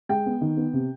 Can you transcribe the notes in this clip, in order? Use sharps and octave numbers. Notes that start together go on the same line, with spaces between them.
G#3 G5
B3
D#3
B3
C3